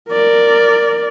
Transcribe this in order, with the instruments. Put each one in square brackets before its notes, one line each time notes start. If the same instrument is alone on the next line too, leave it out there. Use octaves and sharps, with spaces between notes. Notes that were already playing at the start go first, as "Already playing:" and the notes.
[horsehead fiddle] A#4 D5